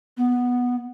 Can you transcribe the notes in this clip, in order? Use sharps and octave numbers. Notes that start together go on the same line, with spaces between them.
B3